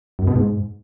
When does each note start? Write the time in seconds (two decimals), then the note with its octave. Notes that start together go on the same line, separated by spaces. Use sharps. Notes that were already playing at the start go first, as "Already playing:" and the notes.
0.19 F#2
0.27 B2
0.36 G#2